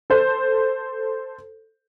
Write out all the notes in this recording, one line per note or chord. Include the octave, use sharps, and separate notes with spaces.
A4 C5